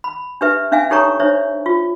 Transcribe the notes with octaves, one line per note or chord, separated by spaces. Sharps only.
B5
D4 G4 B4 E5
C#4 D4 E5 F5 G#5
D#4 G4 A4 C#5 A#5 C#6
D4 C5 C#5 E5
F4